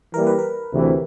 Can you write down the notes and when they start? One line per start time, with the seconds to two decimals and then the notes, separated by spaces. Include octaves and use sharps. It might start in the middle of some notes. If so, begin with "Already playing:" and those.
0.14 E3 G3 A#3 A#4
0.27 B4
0.39 A#4
0.72 D2 C3 E3